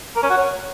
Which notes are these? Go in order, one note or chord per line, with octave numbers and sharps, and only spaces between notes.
A#4
C#4
F#4
C#5